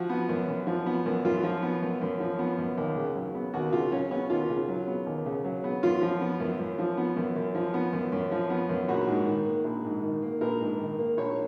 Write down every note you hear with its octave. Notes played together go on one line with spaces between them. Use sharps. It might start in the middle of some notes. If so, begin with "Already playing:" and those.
Already playing: F3 F#4
B3
F#2
F#2
F3
B3
F#2
F#2 F4
F3
B3
F#2
F#2
F3
B3
F#2
D#2
C#3
F#3
B3
D#2 F#4
C#3 F4
F#3 C#4
B3 C#4
D#2 F4
C#3
F#3
B3
D#2
C#3
F#3
B3
F#2 F4
F3
B3
F#2
F#2
F3
B3
F#2
F#2
F3
B3
F#2
F#2
F3
B3
F#2
A#1 F#4
G#2
D#3
A#3
A#1
G#2
D#3
A#3
A#1 A#4
G#2
D#3
A#3
A#1 C#5